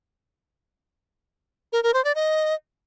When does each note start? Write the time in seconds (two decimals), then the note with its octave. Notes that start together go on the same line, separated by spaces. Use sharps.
1.73 A#4
1.83 A#4
1.94 C5
2.05 D5
2.15 D#5